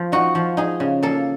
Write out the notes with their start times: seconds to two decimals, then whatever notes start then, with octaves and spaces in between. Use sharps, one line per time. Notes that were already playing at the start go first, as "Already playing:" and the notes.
Already playing: F3
0.12 D#4 F#4
0.35 F3
0.57 D#4 G#4
0.80 C#3
1.03 A#3 A4